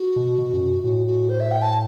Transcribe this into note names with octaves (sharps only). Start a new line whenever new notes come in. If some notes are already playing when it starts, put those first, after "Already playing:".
Already playing: F#4
B2
B2
F#2
A2 F#4
F#4
C5
E5
G5
A5